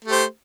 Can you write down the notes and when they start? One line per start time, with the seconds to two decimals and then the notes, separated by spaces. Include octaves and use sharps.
0.04 A3
0.08 G4
0.12 C5